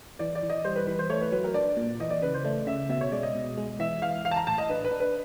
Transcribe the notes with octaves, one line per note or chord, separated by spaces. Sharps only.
E3 D5
D5
E3
D#5
G3 C5
B4
E3 B4
C5
A3 C#5
B4
F#3 B4
A#4
D4 D5
A#2
E3 D#5
D5
C#3 B4
C5
A3 D5
C#3 E5
B2 E5
C#5
G#3 D5
D#5
B2
G#3
E3 E5
E3 F5
E3 F5
A5
A#5
A2 A5
D#5
D4 B4
B4
D4
B4